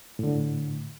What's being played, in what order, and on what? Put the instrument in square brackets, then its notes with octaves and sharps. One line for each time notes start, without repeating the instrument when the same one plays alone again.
[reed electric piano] A2 D3